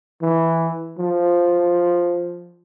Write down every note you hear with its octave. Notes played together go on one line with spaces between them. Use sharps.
E3
F3